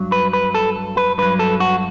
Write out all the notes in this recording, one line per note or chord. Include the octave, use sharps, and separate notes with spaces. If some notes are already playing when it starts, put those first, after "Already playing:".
Already playing: G2 F#3
B4
B4
A4
B4
G2 F#3 B4
A4
F#4